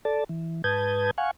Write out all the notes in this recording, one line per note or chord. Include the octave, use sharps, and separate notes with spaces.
A4 D5 A5
E3
G#2 B4 A5 D#6 G6 G#6
F5 F#5 G#5 C#6